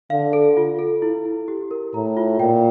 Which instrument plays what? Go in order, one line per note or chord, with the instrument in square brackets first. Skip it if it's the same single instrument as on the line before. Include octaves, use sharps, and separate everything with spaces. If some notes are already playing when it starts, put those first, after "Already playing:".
[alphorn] D3 [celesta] F5
[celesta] A4
F4
A4
E4
E4
G4
A#4
[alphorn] A2 [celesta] A#5
[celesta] F4
[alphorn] A#2 [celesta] G5